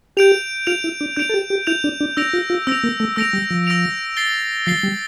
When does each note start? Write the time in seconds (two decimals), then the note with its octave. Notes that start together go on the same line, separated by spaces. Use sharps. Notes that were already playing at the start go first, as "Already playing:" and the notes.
0.17 G4 G6 D7 F7
0.67 F4 G6 D7 F7
0.84 E4
1.01 D4
1.16 D4 G6 D7 F7
1.29 A4
1.34 G4
1.50 G4
1.67 E4 G6 D7 F7
1.84 D4
2.01 D4
2.17 D4 E6 A#6 D7 F7
2.33 F4
2.50 F4
2.67 C4 E6 A#6 D7 F7
2.84 A#3
3.00 A3
3.16 A3 E6 A#6 D7 F7
3.33 G3
3.51 F3
3.67 E6 A#6 D7 F7
4.17 A6 C7 G7
4.66 F3 A6 C7 G7
4.83 G3